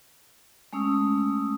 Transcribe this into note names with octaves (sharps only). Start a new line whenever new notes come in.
G#3 A3 C#4 D#6 E6